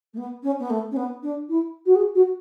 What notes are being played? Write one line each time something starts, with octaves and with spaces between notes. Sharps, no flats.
A3
B3
C#4
B3
A3
C#4
B3
D4
E4
F#4
G#4
F#4